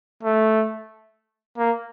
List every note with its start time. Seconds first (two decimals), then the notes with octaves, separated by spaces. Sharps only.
0.23 A3
1.58 A#3